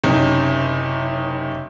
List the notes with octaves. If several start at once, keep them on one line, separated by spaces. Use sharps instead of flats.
F#1 C3 C#4 D#4